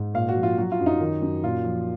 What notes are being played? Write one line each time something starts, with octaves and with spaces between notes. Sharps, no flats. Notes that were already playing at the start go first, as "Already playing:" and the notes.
Already playing: G#2
A#2 F5
F#4
F3
F4
F#3 F#4
F4
F#2
D#4
D#3
F#2
A#2 F4
F3